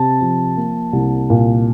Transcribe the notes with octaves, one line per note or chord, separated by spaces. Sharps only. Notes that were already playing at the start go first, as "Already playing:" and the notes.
Already playing: C3 A5
F3
A#3
C2
A#2